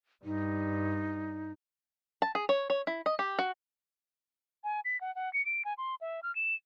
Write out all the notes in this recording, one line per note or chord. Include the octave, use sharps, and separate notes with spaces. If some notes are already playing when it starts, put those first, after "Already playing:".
G2 G3 D#4
A5
G#4
C#5
C#5
E4
D#5
G4
F#4
G#5
B6
F#5
F#5
C#7
D7
G#5
C6
E5
F6
E7